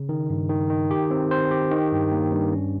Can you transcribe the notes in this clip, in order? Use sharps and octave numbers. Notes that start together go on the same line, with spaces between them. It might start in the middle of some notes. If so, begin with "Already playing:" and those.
Already playing: C#3
D#3
G2
D#3
D#3
G4
C4
C5
G4
D#3
G2
A#3
G2
C#4